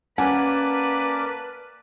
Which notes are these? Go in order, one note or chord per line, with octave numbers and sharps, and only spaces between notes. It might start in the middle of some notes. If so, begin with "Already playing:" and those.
A#3 C#4 B4 D5 F#5 G#5 A5